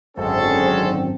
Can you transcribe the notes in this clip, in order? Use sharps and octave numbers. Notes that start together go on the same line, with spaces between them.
G#1 F#2 D3 G#3 C4 C#4 A4 C5